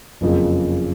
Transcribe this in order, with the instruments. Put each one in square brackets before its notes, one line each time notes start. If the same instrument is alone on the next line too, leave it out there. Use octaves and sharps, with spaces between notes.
[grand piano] F#1 F2 C#3